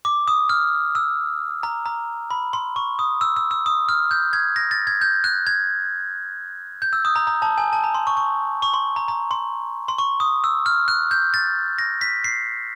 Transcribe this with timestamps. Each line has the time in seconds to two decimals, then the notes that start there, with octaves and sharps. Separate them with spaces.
0.05 D6
0.28 D#6
0.49 F6
0.95 E6
1.63 A#5
1.86 A#5
2.31 B5
2.53 C6
2.76 C#6
2.99 D#6
3.21 E6
3.36 E6
3.51 E6
3.66 D#6
3.89 F6
4.11 G6
4.33 G#6
4.56 A#6
4.71 A6
4.87 G#6
5.01 G6
5.24 F#6
5.47 G#6
6.82 G6
6.93 E6
7.05 D#6
7.16 A#5
7.27 A#5
7.42 A5
7.58 G#5
7.73 A5
7.84 A#5
7.94 C6
8.07 C#6
8.17 C#6
8.62 C#6
8.74 C6
8.96 A#5
9.08 A#5
9.31 C6
9.88 C6
9.98 C#6
10.20 D#6
10.44 E6
10.66 F6
10.88 F#6
11.11 G6
11.34 A6
11.78 A#6
12.01 B6
12.24 C7